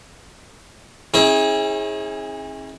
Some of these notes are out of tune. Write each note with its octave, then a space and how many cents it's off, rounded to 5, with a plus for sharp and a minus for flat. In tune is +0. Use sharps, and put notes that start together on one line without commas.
C#4 -40 E4 -40 G#4 +0